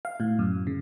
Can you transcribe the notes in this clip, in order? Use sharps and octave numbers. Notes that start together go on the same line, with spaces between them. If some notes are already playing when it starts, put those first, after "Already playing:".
F5
A2
F#2
C#3